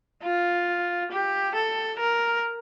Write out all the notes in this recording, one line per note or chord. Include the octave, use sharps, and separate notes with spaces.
F4
G4
A4
A#4